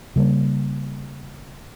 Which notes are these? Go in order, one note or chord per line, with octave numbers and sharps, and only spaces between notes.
C#3 G3 G#3 A#3